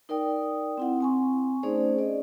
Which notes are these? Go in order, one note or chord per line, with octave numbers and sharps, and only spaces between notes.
D#4 A#4 D5 G5 D#6
C4 E4 F#5
C4 G#5 C#6
A3 C#4 D#4 G#4 C5 D5
D5 D#5